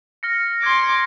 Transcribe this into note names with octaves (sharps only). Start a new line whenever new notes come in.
F6 A#6 C#7
C6 D6 G#6 C#7